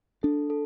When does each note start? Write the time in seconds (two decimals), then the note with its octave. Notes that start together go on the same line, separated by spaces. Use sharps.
0.23 D4 A4
0.50 A4